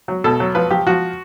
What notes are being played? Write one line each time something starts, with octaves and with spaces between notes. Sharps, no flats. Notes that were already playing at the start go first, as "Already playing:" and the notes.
F#3
B2 A4
F#3
F3 B4
F3 G4
F3 F#4